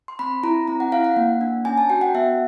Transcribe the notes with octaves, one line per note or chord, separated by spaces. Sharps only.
C6
C4 B5
E4 A#5
C4 A#5
F#5
E4 F5
F#5
A#3
D4
C#4 G#5
A5
F#4 G5
F#5
B3 E5